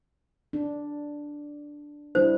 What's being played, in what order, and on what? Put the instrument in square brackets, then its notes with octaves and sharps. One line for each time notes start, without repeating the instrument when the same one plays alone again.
[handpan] D4
[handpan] G3 D4 E4 [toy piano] C5